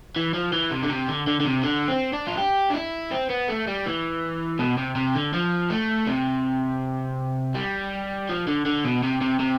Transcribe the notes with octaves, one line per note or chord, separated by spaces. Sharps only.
E3
F3
E3
C3
D3
C3
D3
D3
D3
C3
D3
C4
D4
F4
G4
D4
E4
C4
B3
A3
G3
E3
B2
C3
C3
D3
F3
A3
C3
G3
F3
D3
D3
B2
C3
C3
C3